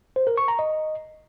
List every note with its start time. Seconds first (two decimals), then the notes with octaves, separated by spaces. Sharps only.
0.16 C5
0.27 A#4
0.38 C#6
0.48 A#5
0.59 D#5